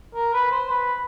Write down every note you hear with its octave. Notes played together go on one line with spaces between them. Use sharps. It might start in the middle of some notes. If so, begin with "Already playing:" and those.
A#4
B4
C5
B4